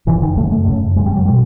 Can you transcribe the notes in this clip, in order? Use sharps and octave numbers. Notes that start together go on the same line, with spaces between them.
F#2 C#3 E3
D#3
F#2 C#3 A3
A3
F#2 C#3
F#2 C#3 G#3
G3
F#3
G3
B2